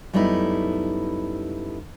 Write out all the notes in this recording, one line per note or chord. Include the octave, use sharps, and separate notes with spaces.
F#2 G3 A3 B3 D#4 E4